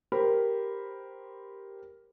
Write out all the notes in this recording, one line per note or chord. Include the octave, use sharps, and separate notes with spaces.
G4 A#4 C5 B5